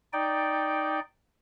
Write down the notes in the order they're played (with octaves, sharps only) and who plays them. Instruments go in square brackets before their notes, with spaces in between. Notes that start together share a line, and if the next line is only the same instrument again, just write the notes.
[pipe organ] D#4 D5 G5